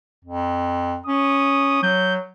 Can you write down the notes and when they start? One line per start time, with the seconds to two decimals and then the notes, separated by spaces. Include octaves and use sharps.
0.25 F2
1.06 C#4 D#6
1.83 F#3 G6